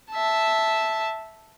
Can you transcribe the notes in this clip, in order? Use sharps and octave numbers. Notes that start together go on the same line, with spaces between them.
E5 A5